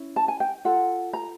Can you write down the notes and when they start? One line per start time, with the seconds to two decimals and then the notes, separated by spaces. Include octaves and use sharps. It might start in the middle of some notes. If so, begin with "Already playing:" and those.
Already playing: C#4 E4
0.16 A5
0.28 G#5
0.40 G5
0.65 F4 A4 F#5
1.13 A#5